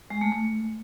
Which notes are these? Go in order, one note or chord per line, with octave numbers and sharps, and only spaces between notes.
G#3
A3
A3